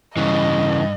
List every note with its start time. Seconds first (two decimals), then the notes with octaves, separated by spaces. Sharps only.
0.17 G2 C#3 E3 D#5